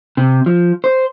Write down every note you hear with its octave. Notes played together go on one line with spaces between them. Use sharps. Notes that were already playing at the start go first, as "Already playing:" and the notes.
C3
F3
C5